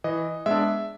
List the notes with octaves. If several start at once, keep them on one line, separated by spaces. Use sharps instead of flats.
E3 D#5
G#3 B3 D4 E5